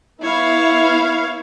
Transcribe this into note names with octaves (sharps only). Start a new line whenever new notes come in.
B3 E4 C#5 F5